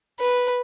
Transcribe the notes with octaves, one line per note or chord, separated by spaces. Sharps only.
B4